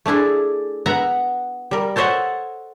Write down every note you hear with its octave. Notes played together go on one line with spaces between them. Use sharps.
A3 D4 E4 G#4
B3 E5 F#5 A#5
G3 A#4
A4 C5 C#5 D#5 E5 F#5